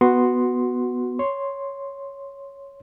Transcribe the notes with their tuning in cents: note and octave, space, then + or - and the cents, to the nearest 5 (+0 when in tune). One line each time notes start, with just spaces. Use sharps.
B3 +0 F#4 +0 C6 +0
C#5 +0 C6 +0